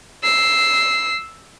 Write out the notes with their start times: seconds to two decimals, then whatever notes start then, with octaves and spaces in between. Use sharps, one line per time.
0.24 E6 C7